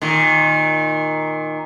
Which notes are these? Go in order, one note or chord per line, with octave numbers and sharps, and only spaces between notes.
A#2 D#3